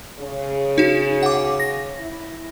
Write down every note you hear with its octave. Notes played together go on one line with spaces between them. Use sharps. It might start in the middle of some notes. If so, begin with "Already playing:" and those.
C#3
D#4 F#4
F#5 D6
A#6
E4